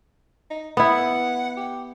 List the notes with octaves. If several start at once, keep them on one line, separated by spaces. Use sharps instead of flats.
D#4
B3 E4 F#5
G4